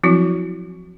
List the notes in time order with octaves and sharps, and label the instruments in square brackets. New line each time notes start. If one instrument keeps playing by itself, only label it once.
[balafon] F3 F#3 C4 E4 F#4